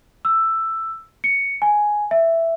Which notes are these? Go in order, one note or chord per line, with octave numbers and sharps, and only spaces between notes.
E6
C#7
G#5
E5